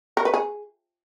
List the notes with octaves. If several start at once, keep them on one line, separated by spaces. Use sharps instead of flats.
A#4
B4
G#4